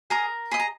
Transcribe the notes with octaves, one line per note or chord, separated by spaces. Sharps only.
G#4 A#4 D#5 A#5
G#4 D#5 B5
A#5